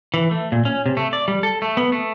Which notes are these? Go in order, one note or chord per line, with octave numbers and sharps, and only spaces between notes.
E3
A3
A#2
C#4
C3
A3
D5
G3
A4
A3
B3
A3